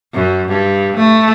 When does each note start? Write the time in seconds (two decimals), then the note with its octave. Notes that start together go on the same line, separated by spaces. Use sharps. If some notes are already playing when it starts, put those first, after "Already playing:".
0.14 F#2
0.49 G2
0.97 A3